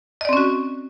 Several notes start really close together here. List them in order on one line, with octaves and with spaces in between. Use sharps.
D#5 D5 C4 C#4 F#4